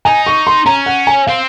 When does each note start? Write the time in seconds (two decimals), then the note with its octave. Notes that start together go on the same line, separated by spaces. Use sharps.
0.05 D#4 G#5
0.26 C#6
0.47 C6
0.66 C#4 A#5
0.86 F#5
1.07 G#5
1.27 C4 F5